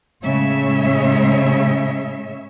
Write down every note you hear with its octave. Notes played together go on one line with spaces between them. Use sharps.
A2 C#3 G#3 C#5 E5